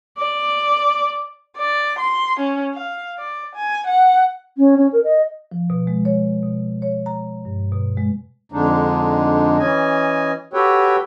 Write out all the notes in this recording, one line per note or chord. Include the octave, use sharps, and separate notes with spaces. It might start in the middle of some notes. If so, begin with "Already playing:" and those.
D5
D5
C6
C#4
F5
D5
G#5
F#5
C#4
C#4
A#4
D#5
F3
B2
G#3
C#5
B2
C#5
A#5
G2
B2
G#3
F2 D3 G#3 D4 D#4
E3 C#4 D#5 G#5
F#4 G4 A4 B4 C#5 G5